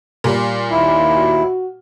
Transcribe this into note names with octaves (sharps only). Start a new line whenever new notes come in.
A#2 G3
D#2 E4
F#4